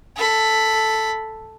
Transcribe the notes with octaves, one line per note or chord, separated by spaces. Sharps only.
A4 B5